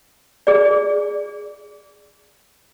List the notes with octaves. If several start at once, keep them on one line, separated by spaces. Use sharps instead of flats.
G#4 D5